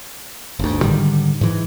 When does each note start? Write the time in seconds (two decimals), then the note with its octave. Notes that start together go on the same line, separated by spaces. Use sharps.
0.59 G1 D2
0.82 G#2 D3 D#3 G3
1.41 G#2 E3